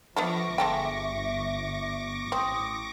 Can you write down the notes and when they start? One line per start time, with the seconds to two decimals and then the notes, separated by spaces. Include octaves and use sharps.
0.16 F3 B3 D4 A4 E5 C#6 D6 A#6
0.58 G1 G#3 A4 G5
2.32 A1 C4 D#6